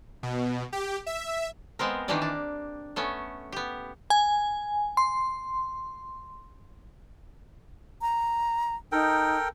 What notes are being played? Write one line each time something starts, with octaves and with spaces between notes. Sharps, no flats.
B2
G4
E5
G#3 B3 C4 A#4
D#3 E3 A#3 D4 G4 D5
D4
A3 B3 C#4
B3 G4
G#5
C6
A#5
D#4 A4 A#4 G5